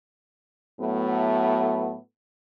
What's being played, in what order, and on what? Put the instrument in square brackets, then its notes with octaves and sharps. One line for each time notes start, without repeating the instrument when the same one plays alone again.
[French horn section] A2 F#3 A3 B3